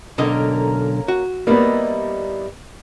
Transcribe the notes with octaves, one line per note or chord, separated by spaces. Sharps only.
B1 D3 A#3 C#4 A#4 D#5
F#4
G3 A#3 B3 D#4 E4